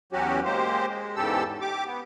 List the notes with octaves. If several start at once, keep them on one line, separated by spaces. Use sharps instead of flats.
E2 F#3 C#4 F#4 G4
G#3 A#3 G4 C5
G#3
E2 G#2 C#3 G4 A4 E6
G4 D6
B3